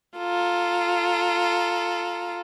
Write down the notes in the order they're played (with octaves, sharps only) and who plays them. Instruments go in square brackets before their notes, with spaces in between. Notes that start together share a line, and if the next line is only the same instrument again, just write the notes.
[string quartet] F4 A4 A#5